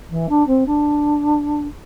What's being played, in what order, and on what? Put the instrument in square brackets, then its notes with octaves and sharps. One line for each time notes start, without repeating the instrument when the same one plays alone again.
[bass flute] E3
D4
C4
D4